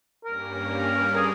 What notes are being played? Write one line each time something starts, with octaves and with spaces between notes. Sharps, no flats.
G2 G3 A#3 C#4 A#4
G#4